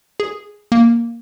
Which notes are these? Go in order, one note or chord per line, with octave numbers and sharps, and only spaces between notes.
G#4
A#3